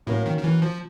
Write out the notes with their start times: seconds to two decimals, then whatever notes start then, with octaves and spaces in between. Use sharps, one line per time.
0.06 A2 F#3 A#3 C#4
0.26 D#3
0.37 D#3
0.44 E3
0.62 F3